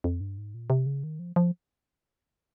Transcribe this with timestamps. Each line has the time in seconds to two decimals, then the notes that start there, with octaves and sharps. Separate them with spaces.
0.04 F2
0.21 G2
0.38 G#2
0.54 A#2
0.70 C3
0.86 C#3
1.04 D#3
1.19 F3
1.36 F3